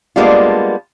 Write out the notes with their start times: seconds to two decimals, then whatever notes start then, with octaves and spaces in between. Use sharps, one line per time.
0.16 G3 G#3 A#3 B3 D4 F4